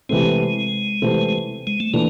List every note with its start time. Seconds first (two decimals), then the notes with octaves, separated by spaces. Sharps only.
0.09 C3 E3 G#3 A3 C4
1.02 C3 E3 A3 C4
1.67 G#3
1.80 A3
1.93 E3 A3 A#3 D4